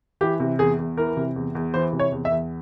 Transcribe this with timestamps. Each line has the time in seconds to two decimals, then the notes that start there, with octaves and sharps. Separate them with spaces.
0.21 E3 G4
0.40 C3
0.59 E2 G#4
0.79 E2
0.97 E3 A#4
1.17 C3
1.36 E2
1.55 E2
1.74 E3 C5
1.93 C3
1.99 C#5
2.12 E2
2.25 E5
2.32 E2